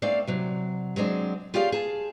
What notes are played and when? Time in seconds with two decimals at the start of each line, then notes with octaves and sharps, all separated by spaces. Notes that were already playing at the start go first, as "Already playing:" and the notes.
0.02 A3 C4 D4 D5 F5
0.27 C3 F#3
0.96 F#3 G#3 C4 D4
1.54 F4 G4 G#4 C#5 D5 F5
1.72 G#4 A5